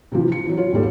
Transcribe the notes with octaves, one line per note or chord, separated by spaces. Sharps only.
C3 E3 F3
C#7
E3 F#3
F4 C#5
G#1 D#2 G3 A4